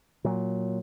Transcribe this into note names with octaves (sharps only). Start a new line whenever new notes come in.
A#2 F#3